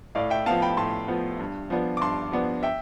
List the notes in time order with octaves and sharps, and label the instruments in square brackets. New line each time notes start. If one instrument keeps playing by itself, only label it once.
[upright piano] A2 D5 F5
E5 G5
F3 B3 F5 A5
G5 B5
A2 A5 C6
F3 B3
G2
F3 B3 D4
D6
G2 A5 C6
F3 B3 D4
E5 G5